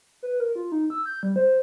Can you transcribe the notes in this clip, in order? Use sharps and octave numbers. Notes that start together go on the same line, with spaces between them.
B4
A#4
F4
D#4
E6
G6
G3
C5